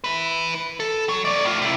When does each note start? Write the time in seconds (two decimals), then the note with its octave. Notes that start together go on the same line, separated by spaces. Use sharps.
0.04 E4 B4
0.80 A4
1.09 F#3
1.25 F#3 D5
1.44 A2 F4
1.61 C3 E4